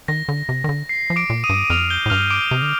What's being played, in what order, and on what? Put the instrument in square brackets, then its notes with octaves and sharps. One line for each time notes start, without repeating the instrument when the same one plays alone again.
[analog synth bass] D#3 [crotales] A#6
[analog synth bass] D3
C3
D#3
D3
[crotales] C7
[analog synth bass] F3
[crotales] D6 D7
[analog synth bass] A#2
[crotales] D#6 D#7
[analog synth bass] G2
[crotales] D#7
[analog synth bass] F2 [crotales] F6 F7
[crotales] G6 G7
[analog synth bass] A2
[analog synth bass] G2 [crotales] F6 F7
[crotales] D6 D7
[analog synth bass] C3
D3